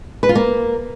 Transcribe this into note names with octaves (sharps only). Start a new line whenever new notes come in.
B4
F4
A#3